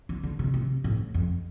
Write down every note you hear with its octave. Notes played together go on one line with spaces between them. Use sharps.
D3
D3
C3
C3
A2
F2